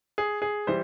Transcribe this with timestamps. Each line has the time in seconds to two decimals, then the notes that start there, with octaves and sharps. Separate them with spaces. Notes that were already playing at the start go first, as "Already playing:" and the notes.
0.18 G#4
0.42 G#4
0.67 E3 G3 C5